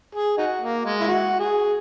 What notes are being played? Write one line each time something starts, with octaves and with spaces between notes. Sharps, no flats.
G#4
D#4 F#4
A#3
G#3
E4
F#4
G#4